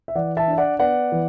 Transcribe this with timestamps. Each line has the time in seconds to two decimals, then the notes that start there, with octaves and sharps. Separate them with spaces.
0.08 E5
0.15 E3 D5 F#5
0.37 E5 A5
0.48 D4
0.53 E5
0.58 D5 F#5
0.79 B3 D5 F#5
1.12 E3